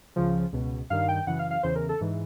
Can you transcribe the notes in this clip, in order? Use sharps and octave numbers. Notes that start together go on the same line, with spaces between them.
C#2 C#3 F3
C#2 B2
G2 D#3 F5
G5
F#2 C#3 E3 F#5
F5
F5
E2 C#3 E3 C5
A#4
A4
G#2 E3